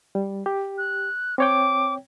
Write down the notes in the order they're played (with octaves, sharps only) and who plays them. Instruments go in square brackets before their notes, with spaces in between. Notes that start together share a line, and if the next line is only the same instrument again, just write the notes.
[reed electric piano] G3
G4
[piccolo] F#6
[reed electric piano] C4 C#5 G5 [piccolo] D6